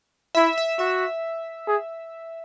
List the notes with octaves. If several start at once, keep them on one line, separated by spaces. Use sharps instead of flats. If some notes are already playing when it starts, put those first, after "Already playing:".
E4 E5
E5
F#4 E5
G#4